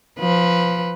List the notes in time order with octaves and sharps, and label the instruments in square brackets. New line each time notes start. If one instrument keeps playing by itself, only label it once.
[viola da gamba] F3 B4